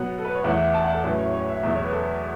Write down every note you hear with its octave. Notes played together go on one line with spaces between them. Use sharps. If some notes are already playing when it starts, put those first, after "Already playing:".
Already playing: B2 F#3 B3 F#5
A4
B4
C#5
E2 E3 A3 F#5
A5
F#5
A4
A2 F#3 C#4 E4 B4
C#5
C#5
E5
E2 B2 F#3 A3 E5
C#5
B4
A4